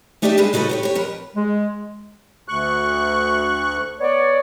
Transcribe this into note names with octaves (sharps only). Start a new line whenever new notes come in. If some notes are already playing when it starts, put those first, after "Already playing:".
A3 D4 D#4 G4 D5 E5
G3 G#3 G#4 B4
C#3 D#4 F#4 G#4 A4 B4
G4 C5 C#5
G4 C#5
F2 A#4 B4
G#3
D2 C#6 F#6
B3 C#5 D5